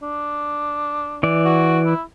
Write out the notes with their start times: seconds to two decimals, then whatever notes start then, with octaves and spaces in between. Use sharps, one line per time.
0.02 D4
1.23 E3 D5
1.46 F#4
1.86 E4